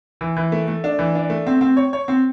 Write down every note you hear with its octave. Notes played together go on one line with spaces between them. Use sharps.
E3
E3
A3
A3
D4
E3
D4
A3
C4
C4
C#5
C#5
C4